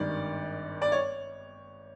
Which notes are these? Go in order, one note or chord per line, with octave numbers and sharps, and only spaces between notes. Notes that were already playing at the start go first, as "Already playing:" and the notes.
Already playing: G#1 G2 D#3 D5
D5
C#5